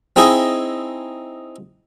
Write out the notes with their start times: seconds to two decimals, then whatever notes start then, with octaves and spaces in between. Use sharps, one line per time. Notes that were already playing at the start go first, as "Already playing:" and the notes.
0.16 C4 D#4 E4 G#4 D#5